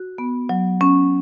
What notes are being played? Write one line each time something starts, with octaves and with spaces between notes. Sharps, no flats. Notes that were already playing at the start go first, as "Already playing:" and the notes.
Already playing: F#4
B3
F#3
C#4